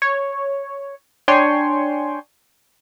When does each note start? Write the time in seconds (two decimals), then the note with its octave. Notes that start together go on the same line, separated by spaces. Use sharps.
0.02 C#5
1.28 D4 C#5 G5 G#5 C6 C#6